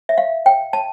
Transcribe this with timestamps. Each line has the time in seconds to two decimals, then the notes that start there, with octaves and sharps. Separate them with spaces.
0.09 E5
0.18 F5
0.46 G5
0.73 A5